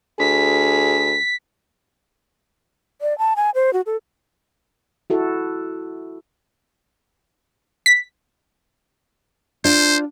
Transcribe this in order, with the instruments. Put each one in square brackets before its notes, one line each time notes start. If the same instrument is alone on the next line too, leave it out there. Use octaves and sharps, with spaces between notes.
[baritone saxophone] D2 [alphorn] G#4 [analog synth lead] B6
[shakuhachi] D5
A5
G#5
C5
F#4
A4
[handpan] E4 F#4 A4
[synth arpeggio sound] B6
[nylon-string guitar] D4 F4 [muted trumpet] C5